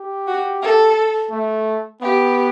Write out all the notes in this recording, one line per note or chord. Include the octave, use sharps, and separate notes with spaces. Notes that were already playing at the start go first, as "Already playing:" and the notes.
Already playing: G4
F#4
A4
A3
B3 G4